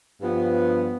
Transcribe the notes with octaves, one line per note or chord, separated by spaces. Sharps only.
G2 F3 B3